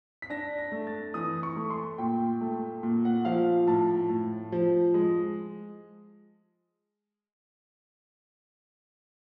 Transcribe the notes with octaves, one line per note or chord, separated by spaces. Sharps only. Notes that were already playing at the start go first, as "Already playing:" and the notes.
B6
D4 A#6
A#6
A3
A6
E3 D#6
C#6
A3
C6
A#2 G5
A3
A#2
F#5
F3 F5
A2 A5
A2
F3
G#3